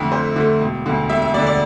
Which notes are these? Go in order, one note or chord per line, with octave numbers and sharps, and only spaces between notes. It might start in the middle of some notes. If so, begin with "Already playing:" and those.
Already playing: F2 D3 A3 E5
F2 C5
D3 A3
E1
D2 D3
E1 E5
E5
D2 D3 D5
D5